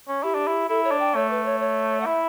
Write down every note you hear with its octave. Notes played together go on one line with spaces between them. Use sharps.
C#4
E4 G4
D4
E4
E4 A4
C#5
D4
G5
A3 C#5
B4
C#5
C#5
F#5
E4 E5